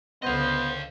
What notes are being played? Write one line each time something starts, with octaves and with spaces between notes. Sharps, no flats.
C#2 D3 B3 C5 D#5 F5